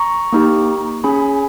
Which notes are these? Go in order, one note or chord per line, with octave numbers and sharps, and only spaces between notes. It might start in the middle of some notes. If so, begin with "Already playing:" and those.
Already playing: A#5 C#6
A#3 D#4 G4
C#4 G#4 G#5 B5